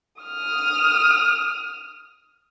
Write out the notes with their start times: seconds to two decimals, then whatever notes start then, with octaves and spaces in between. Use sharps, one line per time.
0.22 D#6 F6